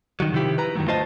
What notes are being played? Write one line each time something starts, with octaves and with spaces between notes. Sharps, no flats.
D#3 F#3
C3 D#3 F3 E4 G4
B4 A#5
G2 D#3 F3 F#3 A3
D2 A3 F4 C5 D#5 A5